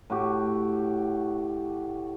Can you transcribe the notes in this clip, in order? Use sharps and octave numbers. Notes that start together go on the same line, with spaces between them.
A2 F#4 G4